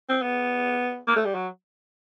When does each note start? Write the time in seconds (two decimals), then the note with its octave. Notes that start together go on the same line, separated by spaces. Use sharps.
0.09 C4
0.22 B3
1.07 A#3
1.16 A3
1.25 G3
1.35 F#3